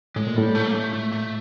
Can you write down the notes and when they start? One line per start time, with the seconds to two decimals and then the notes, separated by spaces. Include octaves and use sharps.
0.16 A2 G#3
0.27 A#2
0.36 A2 G3
0.55 A3
0.67 A#3
0.75 A3
0.93 A3
1.12 A3